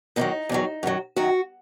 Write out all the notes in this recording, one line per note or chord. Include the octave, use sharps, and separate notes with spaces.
E2 C3 D#3 F#3 D#4
E2 C3 D#3 F#3
F#2 D#3 F#3
F#2 D#3 F#3 F#4